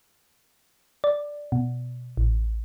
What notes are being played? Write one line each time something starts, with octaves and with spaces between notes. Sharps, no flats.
D5
B2
A1